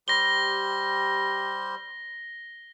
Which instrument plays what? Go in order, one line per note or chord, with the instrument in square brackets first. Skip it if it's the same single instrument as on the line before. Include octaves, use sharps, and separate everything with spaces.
[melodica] G3 G4 C5 [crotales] A#6 G7